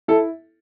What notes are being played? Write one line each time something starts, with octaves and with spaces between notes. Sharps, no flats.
E4 A4